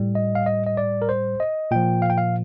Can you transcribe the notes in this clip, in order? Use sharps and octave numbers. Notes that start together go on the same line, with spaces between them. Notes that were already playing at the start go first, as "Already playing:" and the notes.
Already playing: A2 G3
D#5
F5
D#5
D#5
D5
A#4
C5
D#5
A#2 F3 G5
F5
G5
F5